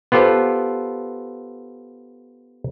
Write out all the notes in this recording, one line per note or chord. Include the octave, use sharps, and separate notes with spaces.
B3 F4 G4 A4 C5